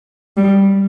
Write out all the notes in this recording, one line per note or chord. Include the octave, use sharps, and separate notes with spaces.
G3